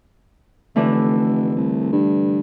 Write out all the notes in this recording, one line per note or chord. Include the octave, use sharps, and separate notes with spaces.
F1 D3 E3 A3
C2
G2